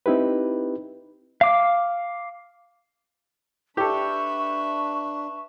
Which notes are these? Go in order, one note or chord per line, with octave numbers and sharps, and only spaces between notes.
C4 D#4 E4 G4 B4
F5 D6
D4 G4 A4 B4 E5 C#6